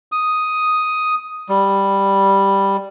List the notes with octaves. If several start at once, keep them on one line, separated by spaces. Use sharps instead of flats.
D#6
G3